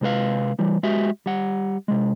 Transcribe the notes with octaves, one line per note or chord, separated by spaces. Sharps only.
C3 G#3 A4 B4 F5
E3 G3
G#3 F#4 G4 E5
G3 F#5
C3 G#3